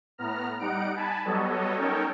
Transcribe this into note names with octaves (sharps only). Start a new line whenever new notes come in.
A2 B3 A#5 F6
G3 D#4 F#5 D7
G#5 A5 B5
F#3 G3 B3 A4 C#5 D#5
C#4 D#4 A4 A#4 C#5 G5